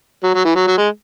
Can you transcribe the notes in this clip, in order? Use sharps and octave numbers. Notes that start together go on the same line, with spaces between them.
F#3
F#3
E3
F#3
F#3
G#3